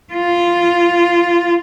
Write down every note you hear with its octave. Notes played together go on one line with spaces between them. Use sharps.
F4